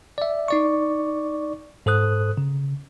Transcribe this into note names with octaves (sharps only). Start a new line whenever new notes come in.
D5 E5
D#4 D5 C#6
G#2 A4 C5 D#6 F#6
C#3